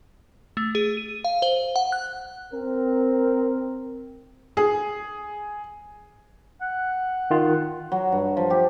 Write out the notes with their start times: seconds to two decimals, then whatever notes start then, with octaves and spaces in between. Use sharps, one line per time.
0.57 A3
0.75 G#4
0.97 D#7
1.24 F5
1.42 C5
1.76 F#5
1.92 F#6
2.53 C4 A#4
4.57 G#4
6.62 F#5
7.31 D#3 F4
7.92 F#3
8.12 G2
8.37 F3
8.50 G4